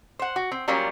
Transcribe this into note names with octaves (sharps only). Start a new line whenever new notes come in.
C5 F#5
F#4
C4
F#3 G3 A#3 C#4 F4